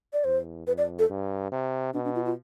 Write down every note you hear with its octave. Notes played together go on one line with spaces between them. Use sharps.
D5
E2 C5
F2 B4
D5
A4
G2
C3
B2 D4
D4
F4
F4